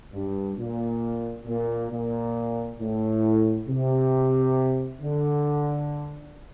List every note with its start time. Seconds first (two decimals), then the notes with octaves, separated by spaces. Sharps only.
0.13 G2
0.57 A#2
1.46 A#2
1.90 A#2
2.79 A2
3.67 C3
5.01 D3